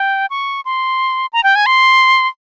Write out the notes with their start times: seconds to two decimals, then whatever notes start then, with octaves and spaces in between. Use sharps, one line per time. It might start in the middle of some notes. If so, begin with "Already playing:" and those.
Already playing: G5
0.30 C#6
0.65 C6
1.33 A#5
1.44 G5
1.56 G#5
1.66 C6